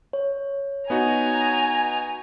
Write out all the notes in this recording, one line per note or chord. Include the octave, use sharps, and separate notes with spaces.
C#5
B3 D#4 F#4 G#5 A#5